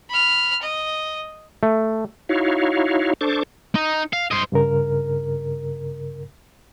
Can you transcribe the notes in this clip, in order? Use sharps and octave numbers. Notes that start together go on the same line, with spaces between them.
B5 F6
D#5
A3
D#4 E4 F#4 C#5 F5
D4 A4 C5 C#6 D6
D#4
F5
C5 D#5
G2 C#3 A#4